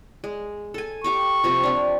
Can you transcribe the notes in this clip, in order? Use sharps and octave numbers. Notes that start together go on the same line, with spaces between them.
G#3
A4 G#5
G4 F5 C#6 D6
C3 F3 F4
C4 D4